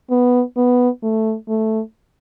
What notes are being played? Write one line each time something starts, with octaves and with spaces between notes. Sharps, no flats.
B3
B3
A3
A3